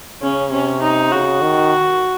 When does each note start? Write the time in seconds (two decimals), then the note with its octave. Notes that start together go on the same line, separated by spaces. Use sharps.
0.21 C#3 C#4
0.51 C3 C#4
0.81 D#4
1.11 C#3 F#4
1.42 D#3